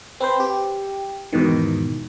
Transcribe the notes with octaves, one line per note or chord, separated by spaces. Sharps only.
C4 B4 C5
G4
E2 G#2 B2 D#3